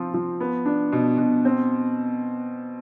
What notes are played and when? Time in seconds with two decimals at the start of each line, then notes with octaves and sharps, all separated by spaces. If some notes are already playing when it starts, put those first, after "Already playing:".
Already playing: F3 C4 F4
0.14 F3
0.40 B3
0.66 D4
0.92 B2
1.18 B2
1.45 C4